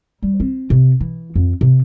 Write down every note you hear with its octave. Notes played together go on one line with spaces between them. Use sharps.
G3
C4
C3
E3
F2
C3